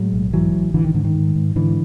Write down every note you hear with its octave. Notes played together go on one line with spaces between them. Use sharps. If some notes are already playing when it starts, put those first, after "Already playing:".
Already playing: A2 F#3 G#3
B1
G#2 E3 F#3
A1
A1 D3 E3
D#3
G#2 D3
D#3
G#2
G#2
G#2 D3 E3